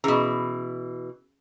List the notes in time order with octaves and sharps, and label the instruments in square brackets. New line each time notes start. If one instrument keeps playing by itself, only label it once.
[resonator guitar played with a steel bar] B2 E3 [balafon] C#4 G#4